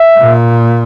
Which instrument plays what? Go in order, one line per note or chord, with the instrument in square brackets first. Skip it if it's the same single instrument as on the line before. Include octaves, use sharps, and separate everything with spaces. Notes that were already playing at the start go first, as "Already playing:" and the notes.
Already playing: [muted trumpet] E5
[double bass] A#2